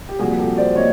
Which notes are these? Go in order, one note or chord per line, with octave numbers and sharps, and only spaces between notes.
G4
C2 A#2 F3 F#4 G#4
G4 A4
C5 D5
A#2 C#5 D#5